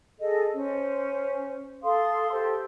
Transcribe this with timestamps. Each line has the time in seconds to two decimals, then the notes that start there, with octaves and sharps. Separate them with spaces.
0.20 G#4 A4 D#5
0.53 C#4 C5
1.83 A4 F5 C6 D#6
2.31 G4 A4 C5